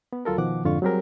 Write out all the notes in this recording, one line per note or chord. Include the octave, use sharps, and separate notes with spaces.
B3
D2 F#3 F4 A4 A#4
B2 D#3 F3 F#5 D6
F2 G#2 D3 F4 F5 C#6
F#3 G3 C4 G4 G#4 A#4